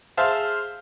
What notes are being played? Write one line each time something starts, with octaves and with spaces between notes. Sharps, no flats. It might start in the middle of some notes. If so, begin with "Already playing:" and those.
G#4 C5 E5 F5 A5